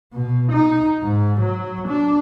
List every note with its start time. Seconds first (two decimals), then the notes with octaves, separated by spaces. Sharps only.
0.14 B2
0.52 D#4
1.03 G#2
1.40 F#3
1.88 D4